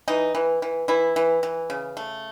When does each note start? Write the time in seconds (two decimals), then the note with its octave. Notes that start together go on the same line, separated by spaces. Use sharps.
0.08 E3 D#4
0.35 E3
0.62 E3
0.88 E3 E4
1.16 E3
1.43 E3
1.70 C#3
1.97 A3